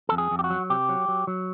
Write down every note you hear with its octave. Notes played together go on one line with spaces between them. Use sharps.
F2 A4
G#4
F2
G4
F#4
F#3
C3 G4
F#3
F#3
F#3